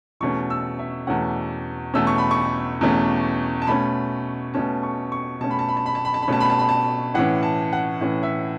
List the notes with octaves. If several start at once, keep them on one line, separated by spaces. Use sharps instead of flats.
E2 B2 A3 C#4 C#6
E6
E5
E2 B2 A3 C#4 F#5
E2 B2 A3 C#4 E6
C#6
B5
C#6
E2 B2 A3 C#4
A5
B2 A3 C#4 B5
B2 A3 C#4 A5
C#6
C#6
B2 A3 C#4 A5
B5
A5
B5
A5
B5
A5
B5
A5
B5
B2 A3 C#4 A5
B5
A5
B5
A5
A2 E3 C#4 F#5
A5
F#5
A2 E3 C#4
E5